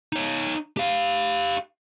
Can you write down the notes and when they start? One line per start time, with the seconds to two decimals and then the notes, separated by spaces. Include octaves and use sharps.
0.13 D#4 C#5
0.77 G4 F5